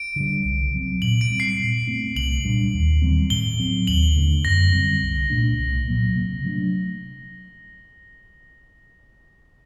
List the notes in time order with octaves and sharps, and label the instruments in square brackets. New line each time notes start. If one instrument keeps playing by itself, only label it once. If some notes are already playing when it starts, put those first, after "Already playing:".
Already playing: [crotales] D7
[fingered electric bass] D3 G3
C2
C3 F#3 C4
[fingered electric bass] A#2 [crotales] F#7
[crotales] D7
[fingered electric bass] G3 C4
[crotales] C7
[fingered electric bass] A#2
A3 C4
[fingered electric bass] C2 [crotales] F#7
[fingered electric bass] A#2 G3 D4
D#2
D#3 G3 C4
[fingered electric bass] A2 [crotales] G7
[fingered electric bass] F#3 C4
[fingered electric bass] D#2 [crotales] F#7
[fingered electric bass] D3 A3
[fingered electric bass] F#2 [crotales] A#6
[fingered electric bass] D3 G3 C4
C2
A#2 A3 D4
C2
A#2 F#3 A#3
C3
F#3 A3 D4